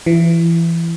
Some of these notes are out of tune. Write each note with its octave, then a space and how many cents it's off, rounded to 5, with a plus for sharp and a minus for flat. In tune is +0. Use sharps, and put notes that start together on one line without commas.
E3 +25